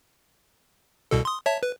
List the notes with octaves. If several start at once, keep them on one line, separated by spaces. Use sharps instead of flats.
C2 B2 A4
C6 D#6
C#5 E5 A5
B4